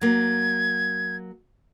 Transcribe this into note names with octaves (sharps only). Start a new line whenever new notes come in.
F#3 A#3 G#6